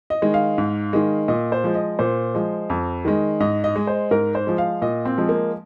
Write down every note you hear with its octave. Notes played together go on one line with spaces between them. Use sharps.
D#5
D#3 G#3
F5
G#2
D#3 G#3
A#2 D#5
C5
F3 G#3
D#5
A#2 C5
F3 G#3
F2
D#3 G#3
G#2 D#5
D#5
G#3
C5
G#2 A#4
C5
F3 G#3
F5
A#2 D#5
C4
F3 G#3
A#3